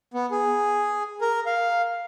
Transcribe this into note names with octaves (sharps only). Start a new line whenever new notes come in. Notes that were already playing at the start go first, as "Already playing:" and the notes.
B3
G#4
A#4
F5